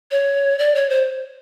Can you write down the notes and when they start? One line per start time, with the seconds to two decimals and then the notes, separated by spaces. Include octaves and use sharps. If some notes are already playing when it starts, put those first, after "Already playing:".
0.11 C#5
0.59 D5
0.75 C#5
0.89 C5